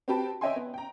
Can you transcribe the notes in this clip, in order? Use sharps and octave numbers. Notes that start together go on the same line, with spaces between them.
C4 F#4 G4 B4 G5 A5
C#5 D#5 E5 G5 G#5 C6
B3
G5 A#5